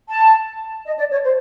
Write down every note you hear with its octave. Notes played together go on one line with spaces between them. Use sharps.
A5
D#5
D5
C#5
C5